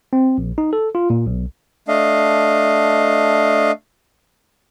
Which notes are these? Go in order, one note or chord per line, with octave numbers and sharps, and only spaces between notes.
C4
A#1
D#4
A4
F4
A#2
B1
A3 D4 D#5 F5